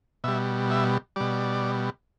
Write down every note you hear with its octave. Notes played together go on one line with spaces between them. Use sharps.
B2 G3 E5
E5
B2 G3 D5